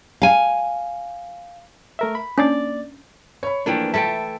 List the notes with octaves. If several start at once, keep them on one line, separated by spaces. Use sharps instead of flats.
F5 G#5
A3 A#4 E5
B5
A#3 C#4 D4 D5 A6
C#5 B5
E3 F3 A3 A#3 D4 G5
A3 E4 A4 E5 G5 A5